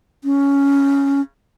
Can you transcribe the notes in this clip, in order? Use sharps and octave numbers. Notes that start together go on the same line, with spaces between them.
C#4